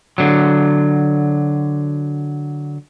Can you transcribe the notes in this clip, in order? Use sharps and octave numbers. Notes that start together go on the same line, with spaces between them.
D3 F#3